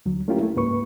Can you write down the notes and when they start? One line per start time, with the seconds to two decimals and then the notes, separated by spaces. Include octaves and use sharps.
0.06 D2 F#3
0.28 A3 C#4 E4 F4 G4 A#4
0.39 A3 E4
0.55 C#2 G#2 A#3 B4 C#6